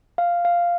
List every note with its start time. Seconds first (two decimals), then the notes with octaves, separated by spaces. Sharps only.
0.18 F5
0.45 F5